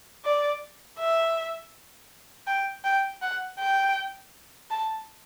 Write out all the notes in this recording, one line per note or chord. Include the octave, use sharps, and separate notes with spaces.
D5
E5
G5
G5
F#5
G5
A5